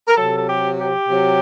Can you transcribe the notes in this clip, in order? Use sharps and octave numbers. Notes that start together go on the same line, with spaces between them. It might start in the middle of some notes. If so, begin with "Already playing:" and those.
A#4
C3 F#3 A4
A4
G4
G4
C3 F#3